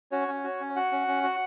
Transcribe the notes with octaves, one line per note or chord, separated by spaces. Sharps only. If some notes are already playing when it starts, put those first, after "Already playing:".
C#4 F#4 C#5
C#4
F#4
C#4
F#4 F#5
C#4
C#4
F#4